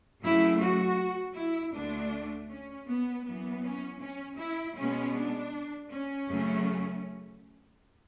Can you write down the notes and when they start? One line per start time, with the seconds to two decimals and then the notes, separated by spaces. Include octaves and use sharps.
0.22 F#2 C#3 F#3 A3 E4
0.60 F#4
1.36 E4
1.74 D2 D3 A3 D4
2.50 C#4
2.88 B3
3.26 F#2 E3 B3
3.63 C#4
4.01 C#4
4.38 E4
4.76 B2 G#3 B3 C#4
5.14 D4
5.91 C#4
6.29 F#2 C#3 F#3 A3